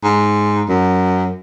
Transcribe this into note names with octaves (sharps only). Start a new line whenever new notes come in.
G#2
F#2